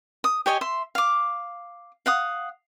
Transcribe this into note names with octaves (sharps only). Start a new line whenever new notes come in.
D#6
G4 C#5 D#5 G#5
E5 C6
F5 D6
F5 F#5 D#6